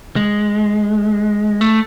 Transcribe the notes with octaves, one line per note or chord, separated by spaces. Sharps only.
G#3
A3